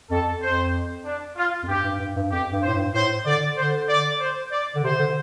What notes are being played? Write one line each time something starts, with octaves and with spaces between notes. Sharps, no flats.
F2 A4
F2 C5
D4
F4
F2
G2 G4
G2
G2
G2
F2 G4
G2
A2 C5
G2
A2 C5
D3 D5
D3 C5
D5
C5
D5
D3
C3 C5
D3